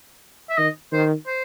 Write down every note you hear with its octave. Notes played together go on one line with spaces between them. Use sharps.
E5
D#3 D#5
D#3 C5
C5